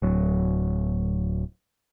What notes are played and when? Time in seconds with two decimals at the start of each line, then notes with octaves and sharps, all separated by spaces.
0.02 D1 F#3